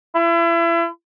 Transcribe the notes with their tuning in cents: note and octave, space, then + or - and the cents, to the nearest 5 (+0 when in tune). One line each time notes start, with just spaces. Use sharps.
E4 +35